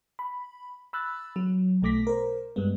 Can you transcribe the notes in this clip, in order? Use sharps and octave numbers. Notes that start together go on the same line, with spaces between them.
B5
B5 E6 F#6 A6
F#3
B1 B2 A3 D6 A#6 B6
A#4 C5
G2 G3 G#3 B3